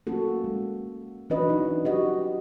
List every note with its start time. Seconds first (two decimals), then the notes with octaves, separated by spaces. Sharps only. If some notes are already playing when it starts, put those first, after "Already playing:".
0.07 A#3 C#4 F#4 A4
0.44 G#3
1.30 E3 C#4 D4 F#4 B4 D#5
1.49 D#4 E4
1.85 F#4 G4 D#5